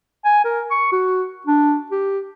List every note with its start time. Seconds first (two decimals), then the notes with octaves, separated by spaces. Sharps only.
0.25 G#5
0.45 A#4
0.71 C#6
0.92 F#4
1.47 D4
1.92 G4